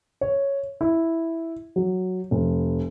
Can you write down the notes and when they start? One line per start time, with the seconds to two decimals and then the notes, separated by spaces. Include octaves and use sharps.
0.21 C#5
0.81 E4
1.76 F#3
2.31 F1